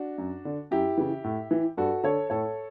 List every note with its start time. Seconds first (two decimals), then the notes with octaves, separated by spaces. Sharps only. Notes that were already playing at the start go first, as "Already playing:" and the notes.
Already playing: D4 F#4
0.18 F#2
0.45 D3
0.71 F#2 E4 G4
0.97 C#3 E3
1.24 A2
1.51 E3
1.77 G2 F#4 A4
2.04 D3 A4 C#5
2.30 A2 A4 C#5